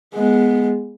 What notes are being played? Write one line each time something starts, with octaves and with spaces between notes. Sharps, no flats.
G#3 B3